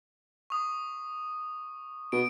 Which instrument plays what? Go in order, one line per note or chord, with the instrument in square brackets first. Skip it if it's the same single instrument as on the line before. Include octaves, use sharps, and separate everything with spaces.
[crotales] C#6 D#6
[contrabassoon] B2 [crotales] D7